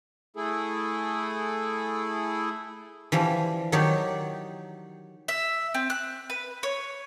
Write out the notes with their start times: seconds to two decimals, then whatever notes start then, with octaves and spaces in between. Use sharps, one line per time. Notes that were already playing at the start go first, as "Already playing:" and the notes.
0.36 A3 E4 G#4 A4
3.12 E3 F3 G3
3.72 D#3 F#3 D#4 G4 C#5 D5
5.28 E5
5.74 C4
5.90 F#6
6.30 B4
6.63 C#5